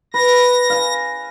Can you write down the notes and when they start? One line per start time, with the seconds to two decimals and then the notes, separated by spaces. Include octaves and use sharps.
0.14 B4 A#6
0.70 F5 G#5